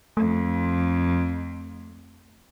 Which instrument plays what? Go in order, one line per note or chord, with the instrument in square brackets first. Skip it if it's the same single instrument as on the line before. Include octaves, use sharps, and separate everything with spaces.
[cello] F2 [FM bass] A3